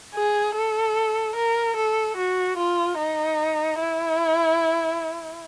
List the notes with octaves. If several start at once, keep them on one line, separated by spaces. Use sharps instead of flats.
G#4
A4
A#4
A4
F#4
F4
D#4
E4